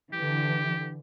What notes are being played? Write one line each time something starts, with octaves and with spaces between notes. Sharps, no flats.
D3 E3 G4